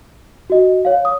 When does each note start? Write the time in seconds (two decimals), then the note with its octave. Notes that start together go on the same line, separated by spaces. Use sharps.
0.50 F#4 D#5
0.85 C#5 F5
1.05 D#6